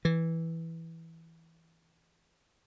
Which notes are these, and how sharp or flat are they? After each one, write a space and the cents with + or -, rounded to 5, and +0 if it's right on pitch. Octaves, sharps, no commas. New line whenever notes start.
E3 -5